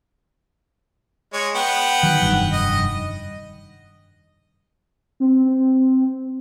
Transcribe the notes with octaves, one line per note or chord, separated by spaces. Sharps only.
G#3 C#5
B3 F#5 G5
D#3 F#3
F1 G2 D#3
D#5
C4